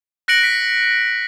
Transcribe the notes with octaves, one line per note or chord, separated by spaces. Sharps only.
F#6 A#6 C#7 D7 F#7
B6